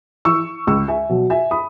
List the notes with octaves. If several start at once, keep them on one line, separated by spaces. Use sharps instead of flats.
E3 C#6 E6
C#2 C#6 E6
E5 G#5
B2 F#3
E5 G#5
B5 D#6